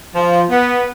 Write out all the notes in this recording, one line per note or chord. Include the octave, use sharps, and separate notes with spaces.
F3
B3